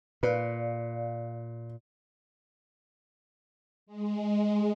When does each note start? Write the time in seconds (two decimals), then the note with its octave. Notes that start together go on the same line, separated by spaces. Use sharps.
0.23 A#2 B4 D5 F5
3.86 G#3